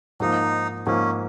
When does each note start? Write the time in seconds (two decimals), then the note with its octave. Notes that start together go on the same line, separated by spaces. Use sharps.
0.20 G#2 F3 A#3 D#4
0.87 G#2 F3 A#3 C#4